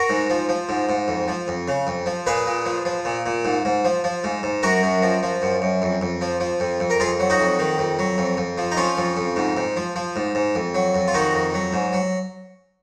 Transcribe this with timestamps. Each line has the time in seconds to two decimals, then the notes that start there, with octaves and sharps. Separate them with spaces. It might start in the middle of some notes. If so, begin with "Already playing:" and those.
Already playing: F#4 A#4
0.09 G#2
0.30 F3
0.49 F3
0.69 G#2
0.89 G#2
1.08 F2
1.28 F3
1.48 F2
1.68 C#3
1.87 F2
2.06 F3
2.27 A#2 G#4 B4
2.46 A#2
2.66 F3
2.85 F3
3.05 A#2
3.26 A#2
3.45 G#2
3.65 G#2
3.85 F3
4.04 F3
4.24 G#2
4.43 G#2
4.63 F#2 F#4 A#4
4.83 F#2
5.03 F3
5.23 F3
5.42 F#2
5.62 F#2
5.82 F2
6.01 F2
6.21 F3
6.40 F3
6.60 F2
6.80 F2
6.90 A#4
7.00 F2 F4 G#4
7.20 F#3
7.30 D#4 F#4
7.40 F2
7.59 D#3
7.78 F2
7.99 F#3
8.18 F2
8.37 F2
8.58 F3
8.72 D#4
8.77 F3 C#4 F4
8.97 F2
9.17 F2
9.36 G#2
9.57 G#2
9.77 F3
9.96 F3
10.16 G#2
10.35 G#2
10.55 F2
10.75 F#3
10.95 F2
11.08 F4
11.14 D#3 D#4 F#4
11.34 F2
11.54 F#3
11.73 G#2
11.93 F#3